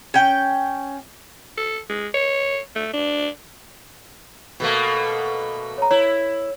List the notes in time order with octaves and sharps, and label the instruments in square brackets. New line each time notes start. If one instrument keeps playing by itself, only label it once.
[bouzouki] C#4 G5
[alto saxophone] A4
G#3
C#5
A3
D4
[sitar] B2 A3 A#3
[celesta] C#5 A#5
[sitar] E4 [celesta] C#5